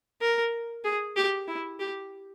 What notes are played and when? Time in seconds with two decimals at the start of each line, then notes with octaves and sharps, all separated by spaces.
0.21 A#4
0.84 G#4
1.16 G4
1.48 E4
1.80 G4